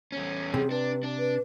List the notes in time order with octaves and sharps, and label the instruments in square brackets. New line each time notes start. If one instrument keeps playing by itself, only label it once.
[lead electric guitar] E2 C#4
[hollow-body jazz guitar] C3 [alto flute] G#4
[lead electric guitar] D4 [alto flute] B4
[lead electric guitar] D4
[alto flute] B4